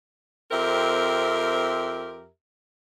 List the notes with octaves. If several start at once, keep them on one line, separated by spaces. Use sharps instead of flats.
F2 C4 G4 A#4 E5